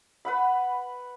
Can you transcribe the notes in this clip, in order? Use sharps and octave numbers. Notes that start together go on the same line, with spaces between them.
B4 F#5 B5